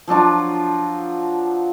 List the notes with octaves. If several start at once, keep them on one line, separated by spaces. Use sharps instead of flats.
F3 F#3 D4 F4